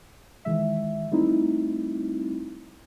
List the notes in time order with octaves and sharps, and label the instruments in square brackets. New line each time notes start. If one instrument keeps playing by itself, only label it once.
[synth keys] D#3 E3 G#3 E5
G3 A3 C4 D#4 E4